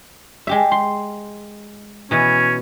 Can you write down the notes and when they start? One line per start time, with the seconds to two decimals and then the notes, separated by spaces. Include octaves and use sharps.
0.47 G#3 G4 E5
0.71 C6
2.11 B2 E3 C#4